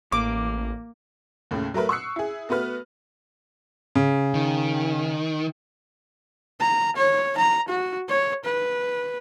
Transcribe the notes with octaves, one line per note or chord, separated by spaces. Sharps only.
A1 A#3 D6
D#2 A2 C#3
F#3 A3 A#4 B4
C#6 D#6 E6 F#6 C7 C#7
E4 G#4
A3 B3 F#4 B4 F6
C#3
D#3
A#5
C#5
A#5
F#4
C#5
B4